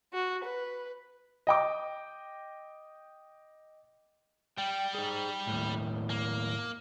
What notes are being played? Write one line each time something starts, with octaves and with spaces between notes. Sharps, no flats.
F#4
B4
D#5 G5 D6
G3 G5
D#4 G#4
D#2 A2
A#3